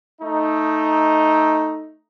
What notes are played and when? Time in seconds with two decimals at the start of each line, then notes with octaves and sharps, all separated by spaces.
0.21 A3 D#4